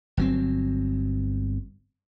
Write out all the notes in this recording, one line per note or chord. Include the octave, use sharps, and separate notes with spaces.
G1 F#3 C4